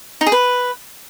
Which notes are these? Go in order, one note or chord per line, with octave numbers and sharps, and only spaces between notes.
D#4
G#4
B4